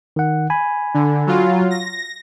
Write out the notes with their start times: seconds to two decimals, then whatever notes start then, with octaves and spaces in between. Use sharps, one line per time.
0.16 D#3 F#5
0.50 G#5 B5
0.94 D3
1.27 F#3 F4
1.71 A#6